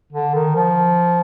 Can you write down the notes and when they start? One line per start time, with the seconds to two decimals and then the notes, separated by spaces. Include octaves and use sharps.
0.13 D3
0.34 D#3
0.55 F3